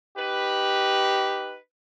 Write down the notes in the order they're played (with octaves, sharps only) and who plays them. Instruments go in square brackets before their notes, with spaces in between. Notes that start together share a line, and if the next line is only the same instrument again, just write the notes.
[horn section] D#4 B4 [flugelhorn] G4